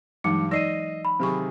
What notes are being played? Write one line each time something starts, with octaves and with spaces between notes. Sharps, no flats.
G2 E3 F#3 G#3 D#4 D6 C#7
D#4 D5 D#5 E6 A#6 C7 D#7
B5
C3 D#3 F#3 G4 G#4 C#6